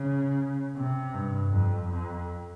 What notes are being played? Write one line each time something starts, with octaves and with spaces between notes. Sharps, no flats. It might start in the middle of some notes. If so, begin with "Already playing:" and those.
Already playing: C#3
C3
G2
F2
F2